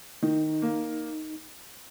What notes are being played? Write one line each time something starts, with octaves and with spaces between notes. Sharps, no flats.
D#3 D#4
A#3